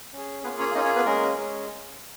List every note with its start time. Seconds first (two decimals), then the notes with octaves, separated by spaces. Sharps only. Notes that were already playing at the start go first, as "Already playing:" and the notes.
0.13 C#4 G#4
0.43 A#3 B3 C#4 F4 G#4 B4
0.60 C#4 C#5
0.75 A#3 C#4 D#4 F4 G#4 D#5
0.85 C#4 C#5
0.96 B3 B4
1.06 G#3 C#4 G#4 A#4
1.37 G#3 C#4 G#4